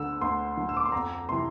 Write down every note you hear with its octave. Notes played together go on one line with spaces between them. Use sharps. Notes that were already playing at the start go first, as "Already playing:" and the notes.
Already playing: D2 D3 E6
D2 C6
D3
E6
D6
C6
F2 A#5
C3 E3 C6